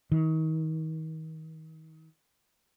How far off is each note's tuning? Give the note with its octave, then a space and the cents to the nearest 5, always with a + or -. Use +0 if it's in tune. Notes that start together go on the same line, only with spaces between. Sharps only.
D#3 +35